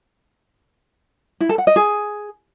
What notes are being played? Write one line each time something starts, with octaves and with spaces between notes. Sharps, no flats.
E4
A4
F#5
D#5
G#4